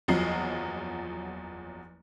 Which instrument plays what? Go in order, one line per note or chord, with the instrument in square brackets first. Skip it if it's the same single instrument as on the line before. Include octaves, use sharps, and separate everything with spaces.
[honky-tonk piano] F#1 E2 F3 F#3 D#5 C7